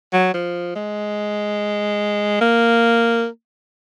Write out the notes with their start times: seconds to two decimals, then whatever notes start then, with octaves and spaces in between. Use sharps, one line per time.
0.13 F#3
0.34 F3
0.75 G#3
2.41 A#3